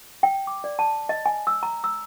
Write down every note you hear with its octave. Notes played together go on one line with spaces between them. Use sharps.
G5
D6
D5
A5
D#5
G#5
E6
A#5
E6